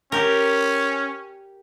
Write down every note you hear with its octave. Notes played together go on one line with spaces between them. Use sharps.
C#4 G4 A#4